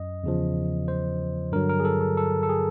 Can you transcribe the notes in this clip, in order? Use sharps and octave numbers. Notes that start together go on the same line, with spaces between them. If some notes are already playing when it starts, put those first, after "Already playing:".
Already playing: F#2 D#5
E2 C#3 F3
C5
G2 D3 F#3 A#4
A#4
G#4
A4
A4
A4
A4
G#4